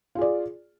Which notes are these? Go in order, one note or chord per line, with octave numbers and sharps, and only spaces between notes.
F4 G#4 D5